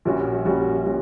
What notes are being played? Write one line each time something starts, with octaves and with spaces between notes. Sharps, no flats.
A#1 A#2 G3 C#4 F#4
A#1 A#2 G3 C#4 F#4
A#2 G3 C#4 F#4